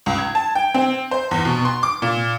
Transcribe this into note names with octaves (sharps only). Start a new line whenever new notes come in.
C#2
G#6
A5
G5
C4
C5
E2
B2
C6
D6
A#2